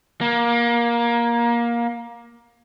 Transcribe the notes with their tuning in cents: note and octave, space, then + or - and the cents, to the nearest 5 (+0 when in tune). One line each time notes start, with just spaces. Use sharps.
A#3 +20